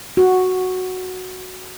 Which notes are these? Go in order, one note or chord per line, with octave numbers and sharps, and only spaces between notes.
F#4